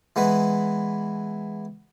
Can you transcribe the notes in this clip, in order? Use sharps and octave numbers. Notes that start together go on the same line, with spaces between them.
E3 G#3 B3 B4